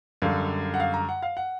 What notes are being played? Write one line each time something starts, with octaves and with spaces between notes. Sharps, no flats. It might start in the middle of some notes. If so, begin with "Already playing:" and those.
F#2 D3 G3 F5
F#5
F5
A#5
F#5
F5
F#5